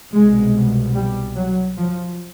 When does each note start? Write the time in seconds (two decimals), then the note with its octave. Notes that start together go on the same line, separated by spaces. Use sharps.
0.12 C2 B2 G#3
0.95 G3
1.36 F#3
1.78 F3